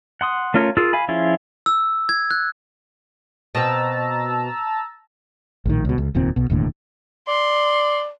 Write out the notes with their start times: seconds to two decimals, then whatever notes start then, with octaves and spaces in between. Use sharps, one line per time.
0.21 F#5 C6 D#6
0.54 A3 C#4 F4 A#4 C#5
0.77 F4 G#4 A#4 E6
0.93 F5 G#5 B5
1.08 F3 C#4 E4 F4 G#4
1.66 E6
2.09 G#6
2.31 F#6
3.55 B2 C4 A5 A#5 E6
5.66 A#1 A2 D#3
5.85 C#2 B2
5.98 C#2
6.15 F1 D#2 A#2 C4
6.36 B1 B2
6.50 E1 D#2 A2 D3
7.28 D5 C6